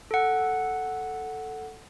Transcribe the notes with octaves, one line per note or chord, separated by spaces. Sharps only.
A4 F#5